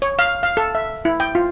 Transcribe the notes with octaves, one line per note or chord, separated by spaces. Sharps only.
C#5
F5
F5
A4
E5
E4
G5
F4